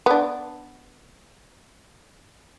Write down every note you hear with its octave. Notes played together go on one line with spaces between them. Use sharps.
B3 D4